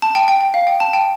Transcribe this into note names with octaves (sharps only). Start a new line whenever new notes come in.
A5
G5
G5
G5
F5
G5
A5
G5